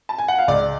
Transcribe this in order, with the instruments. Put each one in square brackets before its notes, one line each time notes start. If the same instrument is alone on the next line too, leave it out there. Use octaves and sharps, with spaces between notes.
[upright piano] A5
G#5
F#5
F5
C#2 D5